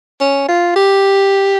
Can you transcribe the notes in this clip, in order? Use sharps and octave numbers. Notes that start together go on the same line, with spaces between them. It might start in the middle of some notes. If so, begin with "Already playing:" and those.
C#4
F4
G4